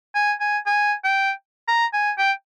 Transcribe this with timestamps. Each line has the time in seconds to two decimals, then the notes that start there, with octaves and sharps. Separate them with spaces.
0.15 G#5
0.40 G#5
0.66 G#5
1.04 G5
1.68 A#5
1.93 G#5
2.18 G5